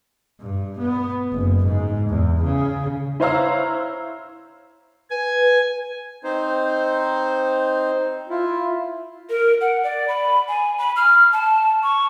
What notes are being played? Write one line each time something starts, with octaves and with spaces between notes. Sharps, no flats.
G2
B3
F#1
G#2
E2
C#3
E4 C5 C#5 F5 A#5 E6
B4 G#5
C4 D#4 C5
E4 F4
A#4
F#5
D5
B5
G#5
B5
F6
A5
C#6